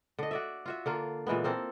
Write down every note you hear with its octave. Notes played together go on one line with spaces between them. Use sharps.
D3 D#5
F#4 D5 E5
F4 F#4 E5
D3 A#3 F4
A#2 E3 G#3 B3
A#3 C4 A4